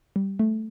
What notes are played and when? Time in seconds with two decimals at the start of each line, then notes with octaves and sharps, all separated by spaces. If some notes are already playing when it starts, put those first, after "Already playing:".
0.16 G3
0.39 A3